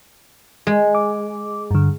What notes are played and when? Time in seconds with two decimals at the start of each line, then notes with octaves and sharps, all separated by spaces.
0.67 G#3
0.95 D6
1.71 G2 D3